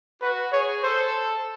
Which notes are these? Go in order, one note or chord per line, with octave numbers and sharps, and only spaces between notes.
F#4 B4
G#4 C#5
A4 C5